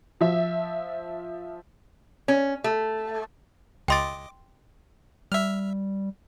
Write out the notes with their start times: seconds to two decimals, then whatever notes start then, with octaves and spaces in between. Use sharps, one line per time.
0.21 F3 E5
2.28 C#4
2.64 A3
3.88 C#2 D#5 G5 C6 D6 A6
5.32 G3 E5 F6